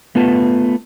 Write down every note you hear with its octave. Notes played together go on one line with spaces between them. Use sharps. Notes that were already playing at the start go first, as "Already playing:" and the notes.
A3 B3 F4 B4 A5